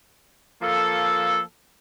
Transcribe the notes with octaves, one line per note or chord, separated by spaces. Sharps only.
F3 A#3 A4